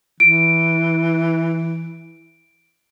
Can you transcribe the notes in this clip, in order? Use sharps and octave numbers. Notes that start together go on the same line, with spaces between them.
E3 D7